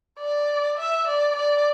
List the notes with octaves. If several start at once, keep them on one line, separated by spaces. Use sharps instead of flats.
D5
E5
D5
D5